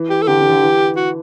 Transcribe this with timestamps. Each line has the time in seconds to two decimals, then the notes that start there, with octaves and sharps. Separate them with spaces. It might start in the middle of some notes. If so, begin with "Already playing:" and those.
Already playing: E3
0.10 G4
0.23 A4
0.27 D3 G4
0.40 D3
0.50 D3
0.63 E3
0.96 F#4